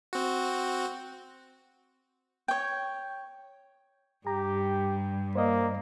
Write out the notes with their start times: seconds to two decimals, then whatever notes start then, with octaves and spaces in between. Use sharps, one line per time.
0.13 C4 F#4
2.48 C#5 G5
4.27 G2 G4 A#5
5.35 A#3 C5 D5 D#5